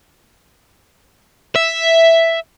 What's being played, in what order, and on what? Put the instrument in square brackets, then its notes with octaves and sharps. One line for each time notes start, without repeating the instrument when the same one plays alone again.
[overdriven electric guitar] E5